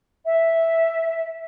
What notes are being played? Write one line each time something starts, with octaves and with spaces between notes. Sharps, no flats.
E5